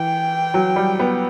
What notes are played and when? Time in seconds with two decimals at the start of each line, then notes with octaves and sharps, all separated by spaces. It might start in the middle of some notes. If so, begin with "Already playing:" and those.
Already playing: E3 G5
0.54 F#3
0.76 G3
1.00 B3